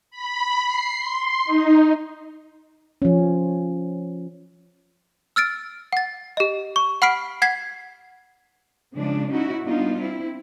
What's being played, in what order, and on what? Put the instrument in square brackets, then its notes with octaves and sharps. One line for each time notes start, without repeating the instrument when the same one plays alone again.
[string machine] B5
C7
C6
D#4
[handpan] F3 C#4
[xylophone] E6 F6 A6 D7
F#5 A6
G4 D#5
C#6
F#5 B5 F6 B6 C7 D7
F#5 G#6 B6 C7
[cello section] C#3 F3 G#3 D4
C#4 D#4 E4 F#4
G3 B3 D4 D#4 F4
C4 E4